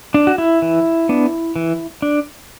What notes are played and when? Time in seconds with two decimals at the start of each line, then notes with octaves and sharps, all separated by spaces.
0.14 D4
0.27 F#4
0.38 E4
0.62 E3
1.09 B3 D4
1.56 E3
2.02 D4